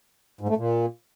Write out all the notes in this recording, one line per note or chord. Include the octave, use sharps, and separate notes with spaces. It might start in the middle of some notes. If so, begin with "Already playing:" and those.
G#2
A3
A#2